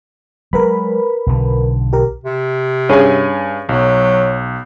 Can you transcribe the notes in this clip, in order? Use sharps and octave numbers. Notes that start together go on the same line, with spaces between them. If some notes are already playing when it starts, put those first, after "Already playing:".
F#3 G#3 A#4 B4 B5
B1 D3
G4 A#4
C3
G2 C#4 G#4 G#5
B1 F#3